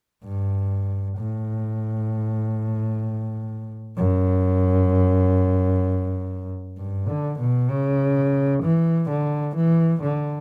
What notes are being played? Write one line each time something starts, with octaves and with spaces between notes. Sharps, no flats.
G2
A2
F#2
G2
D3
B2
C#3
E3
D3
E3
D3